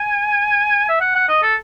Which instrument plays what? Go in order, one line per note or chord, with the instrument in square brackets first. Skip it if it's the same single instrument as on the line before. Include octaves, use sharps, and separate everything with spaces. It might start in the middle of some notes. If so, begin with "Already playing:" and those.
Already playing: [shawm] G#5
E5
F#5
F#5
D#5
A4